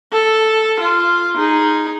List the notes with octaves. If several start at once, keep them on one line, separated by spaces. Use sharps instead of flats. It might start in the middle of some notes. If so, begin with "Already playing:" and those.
A4
F4
D#4 G#4